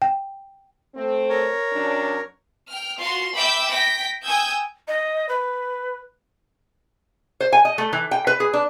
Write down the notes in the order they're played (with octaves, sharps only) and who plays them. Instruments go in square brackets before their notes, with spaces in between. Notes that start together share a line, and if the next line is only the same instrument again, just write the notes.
[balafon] G5
[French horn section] A3 C4
[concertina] A#4 C#5
[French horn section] F#3 C#4 D4
[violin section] G5 F6
F4 F#4 C6
E5 G5 B5 D6 E6 G6
G5 A#6 B6
G5 G#5 D#6 E6 G6 G#6
[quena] D#5
B4
[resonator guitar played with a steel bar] C5
G#5
D#5
A3
E3
G5
B4
G#4
D4